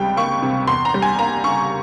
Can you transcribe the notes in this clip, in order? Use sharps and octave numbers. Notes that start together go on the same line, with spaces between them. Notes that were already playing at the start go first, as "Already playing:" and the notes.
Already playing: C#2 C3 G3 G5
A#3 C#6
C3
E2 C6
A#5
G3
G#5
A#3 A#5
C#3 C#6